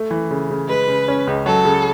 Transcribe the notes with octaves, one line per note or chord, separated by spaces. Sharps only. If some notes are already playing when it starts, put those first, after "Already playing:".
Already playing: A3
E3
C#3
C#3
G#3 B4
C#3
C#4
C#2
F#3 A4
C#3